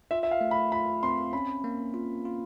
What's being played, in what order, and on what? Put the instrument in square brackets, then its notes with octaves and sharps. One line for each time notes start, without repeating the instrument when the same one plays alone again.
[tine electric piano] F4 [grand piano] E5
[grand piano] E5
F5
[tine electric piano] A3
[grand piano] B5
[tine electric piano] F4 [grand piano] B5
[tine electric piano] C4 [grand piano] C6
[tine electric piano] C#4 [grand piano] B5
[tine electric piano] A#3
F4
F4